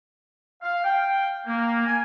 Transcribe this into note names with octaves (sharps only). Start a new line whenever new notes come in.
F5
G5
A#3
G#5